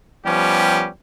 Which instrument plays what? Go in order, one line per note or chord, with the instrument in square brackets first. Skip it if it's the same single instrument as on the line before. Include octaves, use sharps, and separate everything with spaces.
[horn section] F3 G3 B3 C#4 G4